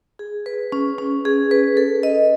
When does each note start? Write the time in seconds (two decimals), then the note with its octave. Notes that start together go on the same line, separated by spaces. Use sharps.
0.19 G#4
0.46 B4
0.72 C#4
0.98 C#4
1.25 G#4
1.51 B4
1.77 A4
2.03 D#5